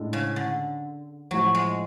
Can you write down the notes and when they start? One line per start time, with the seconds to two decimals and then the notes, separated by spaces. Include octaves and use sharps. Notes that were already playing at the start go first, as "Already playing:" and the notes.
Already playing: A2 G#3 D4
0.13 C#3
0.36 D3
1.31 A2 F3 F#3 A3
1.55 G#3